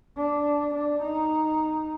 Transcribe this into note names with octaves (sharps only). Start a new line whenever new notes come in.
D4
D4
D#4